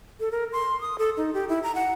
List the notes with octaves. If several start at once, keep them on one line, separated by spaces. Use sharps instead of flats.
A4
A#4
C6
D#6
A4
D#4
G4
E4
A#5
F#5